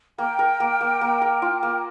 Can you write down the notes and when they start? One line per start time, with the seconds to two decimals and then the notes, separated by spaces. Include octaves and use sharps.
0.18 A#3 G5
0.39 A#4
0.60 A#3
0.81 A#3
1.01 A#3
1.22 A#4
1.42 F4
1.63 A#3